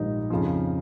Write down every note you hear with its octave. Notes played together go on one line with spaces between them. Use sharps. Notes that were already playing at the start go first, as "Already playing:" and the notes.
Already playing: A#1 G#2 D#3 G3 D#4
F2 C#3 F3